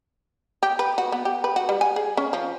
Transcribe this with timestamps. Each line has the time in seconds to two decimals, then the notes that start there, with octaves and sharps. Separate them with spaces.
0.63 G4
0.79 B4
0.98 F#4
1.12 B3
1.25 G4
1.44 B4
1.56 F#4
1.69 G3
1.81 G#5
1.96 G#4
2.17 C#4
2.33 F3